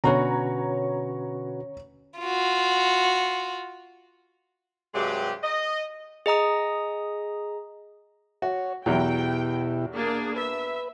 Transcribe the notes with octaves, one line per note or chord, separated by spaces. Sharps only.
B2 D3 C#4 F#4 B4 C#5 A#5
F4 F#4
G2 C3 F#3 G#3 G4
D#5
G#4 D#5 A#5 D#6
F#4 C#5
E2 B2 F#3 E4 G4 G5
A#3 D4 G#4
B4 E5